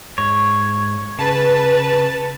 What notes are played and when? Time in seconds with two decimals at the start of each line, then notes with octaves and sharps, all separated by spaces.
0.18 G#2 C#5
1.19 C#3 B4 A5